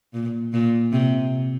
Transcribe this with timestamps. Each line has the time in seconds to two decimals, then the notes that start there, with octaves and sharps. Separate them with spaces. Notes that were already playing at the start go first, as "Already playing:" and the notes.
0.14 A#2
0.53 A#2
0.92 C3